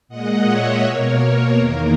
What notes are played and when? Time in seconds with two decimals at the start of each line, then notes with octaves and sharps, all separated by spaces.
0.08 A#2 G#3 D#5 F#5
0.45 C#5 E5
0.82 B2 A#3 A#4 C#5
1.57 E2 D#3 A#3 A#4